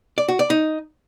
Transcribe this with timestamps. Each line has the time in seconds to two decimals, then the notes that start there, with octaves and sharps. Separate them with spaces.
0.18 D5
0.28 F#4
0.39 D5
0.50 D#4